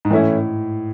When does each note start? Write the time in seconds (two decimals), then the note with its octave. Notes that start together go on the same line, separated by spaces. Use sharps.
0.05 G#2
0.10 A2 E3 A3 C#4 E4